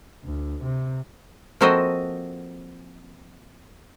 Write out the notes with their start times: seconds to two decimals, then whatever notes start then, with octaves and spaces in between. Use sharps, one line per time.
0.24 D2
0.62 C3
1.61 F3 A#3 C4 F#4 A4 D#5